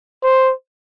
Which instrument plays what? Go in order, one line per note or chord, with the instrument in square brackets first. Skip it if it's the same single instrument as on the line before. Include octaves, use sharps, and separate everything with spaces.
[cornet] C5